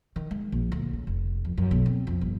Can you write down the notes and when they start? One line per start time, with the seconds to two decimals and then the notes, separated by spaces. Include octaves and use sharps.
0.16 D#3
0.31 G#3
0.52 A#1
0.72 D2
0.93 C#3
1.07 F1
1.45 F2
1.57 F#2
1.71 B1
1.86 C4
2.07 F2
2.21 G1